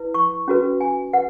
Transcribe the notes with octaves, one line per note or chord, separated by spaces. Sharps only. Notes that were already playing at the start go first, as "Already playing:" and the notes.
Already playing: E4 B4
C#6
C#4 F#4 B4
G#5
B4 F#5